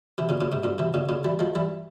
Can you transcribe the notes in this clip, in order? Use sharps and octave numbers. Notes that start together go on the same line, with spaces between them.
C3 E3
A#2 C#3
A#2 C#3
G#2 C3
G2 A#2
C3 E3
A#2 C#3
A#2 C#3
E3 G3
F3 G#3
E3 G3